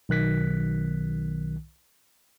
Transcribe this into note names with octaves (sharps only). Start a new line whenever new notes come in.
B1 D#3 F#6 B6